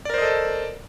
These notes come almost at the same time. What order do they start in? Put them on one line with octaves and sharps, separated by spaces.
D5 A#4 C5 D#5 A4